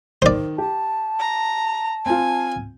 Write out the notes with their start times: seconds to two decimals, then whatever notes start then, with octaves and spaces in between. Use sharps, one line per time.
0.22 D#3 C5 D5
0.58 G4 A5
1.20 A#5
2.06 C4 F4 G#5